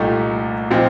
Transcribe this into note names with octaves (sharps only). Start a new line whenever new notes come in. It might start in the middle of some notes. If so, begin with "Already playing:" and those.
Already playing: C2 A#2 A3 D#4 G4
A#2 F3 C4 D#4